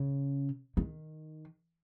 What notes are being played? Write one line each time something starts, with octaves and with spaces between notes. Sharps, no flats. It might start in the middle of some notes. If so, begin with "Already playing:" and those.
Already playing: C#3
D#3